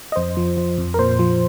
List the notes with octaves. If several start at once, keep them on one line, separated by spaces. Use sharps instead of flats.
D#5
F2 C5
F3
F3
F2
A#4
A#2 C5
F3